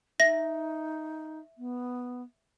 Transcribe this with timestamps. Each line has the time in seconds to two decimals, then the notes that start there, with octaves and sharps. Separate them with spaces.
0.20 D#4 E5 A#6
1.58 B3